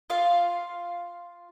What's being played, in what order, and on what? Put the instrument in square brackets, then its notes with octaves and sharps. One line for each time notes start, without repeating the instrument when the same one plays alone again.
[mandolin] F4 F5